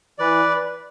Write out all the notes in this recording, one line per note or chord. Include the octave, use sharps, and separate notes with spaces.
E3 B4 D5